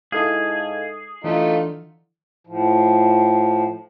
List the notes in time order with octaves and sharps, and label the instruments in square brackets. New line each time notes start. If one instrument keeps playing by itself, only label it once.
[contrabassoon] G#2 [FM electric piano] E4 A4 F5 [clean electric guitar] G#4
[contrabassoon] D3 [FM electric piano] E3 [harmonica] A3 D#4 F4
[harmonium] A2 F3